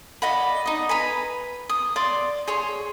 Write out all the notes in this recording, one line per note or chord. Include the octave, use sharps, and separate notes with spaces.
D5 D#5 F#5 B5
D#4 D#5
B4 G#5 A#5 B5
D#6
D5 C6 D6
G#4 C#5 C6